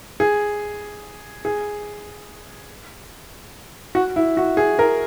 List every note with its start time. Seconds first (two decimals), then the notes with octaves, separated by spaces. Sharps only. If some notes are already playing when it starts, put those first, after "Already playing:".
0.20 G#4
1.45 G#4
3.95 F#4
4.16 E4
4.37 F#4
4.57 G#4
4.79 A#4